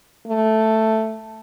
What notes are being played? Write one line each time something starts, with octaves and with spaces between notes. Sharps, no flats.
A3